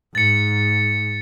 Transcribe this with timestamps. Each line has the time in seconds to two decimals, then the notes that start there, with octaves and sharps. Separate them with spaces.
0.15 G#2 A6 C#7